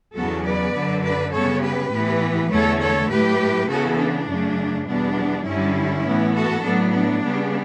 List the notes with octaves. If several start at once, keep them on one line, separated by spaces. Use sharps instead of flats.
E2 C#3 F#3 B3 F#4 A4
B4 D5
F#2 D3 F#3
B4 D5
C#3 G3 B3 A4 C#5
G4 B4
A2 E3 B3
E2 D3 A3 A4 C#5
A4 C#5
A2 F#3 A3 G4 B4
C#3 E3 B3 F#4 A4
D4
F#2 C#3 F#3 A3
E2 B2 G3 B3 D4
G2 D3 G3 C#4 E4
A2 E3 B3
F#4 A4
A2 F#3 B3 D4
D4
C#3 G3 B3